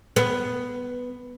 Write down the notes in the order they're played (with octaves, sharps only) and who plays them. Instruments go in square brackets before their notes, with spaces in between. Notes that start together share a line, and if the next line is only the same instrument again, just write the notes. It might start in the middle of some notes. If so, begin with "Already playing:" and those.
[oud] B3